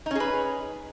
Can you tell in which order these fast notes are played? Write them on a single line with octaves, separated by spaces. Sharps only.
D#4 C#4 G#4 B4